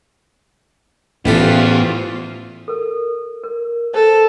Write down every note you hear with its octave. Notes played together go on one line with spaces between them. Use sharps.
A1 A2 E3 B3 F4 G4 A4 C5
A4 A#4
A#4
A4 C5 A5